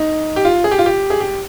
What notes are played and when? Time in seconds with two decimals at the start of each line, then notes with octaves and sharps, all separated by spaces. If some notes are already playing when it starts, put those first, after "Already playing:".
Already playing: D#4
0.36 G4
0.45 F4
0.64 G#4
0.71 G4
0.79 F4
0.86 G4
1.10 G#4
1.20 G4